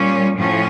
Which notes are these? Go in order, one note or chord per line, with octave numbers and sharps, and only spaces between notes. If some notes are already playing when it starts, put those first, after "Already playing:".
Already playing: A#2 G3 C#4
A2 F3 C#4